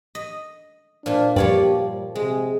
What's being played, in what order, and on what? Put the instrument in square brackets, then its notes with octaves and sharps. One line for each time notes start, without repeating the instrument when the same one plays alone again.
[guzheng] D#5
[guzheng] A#2 F4 [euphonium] D4 [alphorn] C5
[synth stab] G2 [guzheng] F3 C#5 D5 [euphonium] A#3 [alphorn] G4
[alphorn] G3
[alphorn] C3 [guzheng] G#3 [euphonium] G#4